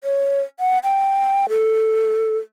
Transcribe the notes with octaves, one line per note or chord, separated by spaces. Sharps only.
C#5
F#5
G5
A4